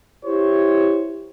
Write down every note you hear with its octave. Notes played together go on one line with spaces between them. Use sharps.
E4 G4 C5 C#5